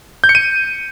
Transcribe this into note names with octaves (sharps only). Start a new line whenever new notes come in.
G6
C#7
D#7